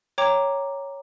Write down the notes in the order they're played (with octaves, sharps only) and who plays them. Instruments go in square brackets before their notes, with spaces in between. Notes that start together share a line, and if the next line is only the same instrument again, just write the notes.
[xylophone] C#5 G5 A#5 D6